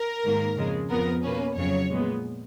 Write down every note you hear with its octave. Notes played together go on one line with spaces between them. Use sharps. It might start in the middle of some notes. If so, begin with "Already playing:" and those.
Already playing: A#4
G#2 D#3 A#3
F2 C#3 G#3
F2 F3 B3 A#4
B2 A#3 C#4 B4
F2 C#3 F#3 C#5
A#2 G#3 B3